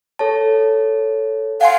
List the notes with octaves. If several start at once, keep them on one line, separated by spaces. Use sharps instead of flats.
A4 C#5 A5
F5 F#5 G#5 C6